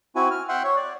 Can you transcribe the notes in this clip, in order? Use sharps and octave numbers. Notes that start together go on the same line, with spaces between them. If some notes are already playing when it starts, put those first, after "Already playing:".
C4 E4 F#4 G#5
F6
E5 F#5 G5 C6
C#5
D5